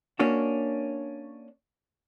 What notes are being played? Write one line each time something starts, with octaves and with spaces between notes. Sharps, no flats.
A#3 C#4 D4 F#4